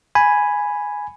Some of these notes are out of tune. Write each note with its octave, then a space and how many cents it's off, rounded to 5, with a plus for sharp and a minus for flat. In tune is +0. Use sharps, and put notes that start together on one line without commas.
G#5 +0 B5 +0